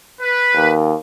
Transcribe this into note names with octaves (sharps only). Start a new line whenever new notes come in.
B4
D#2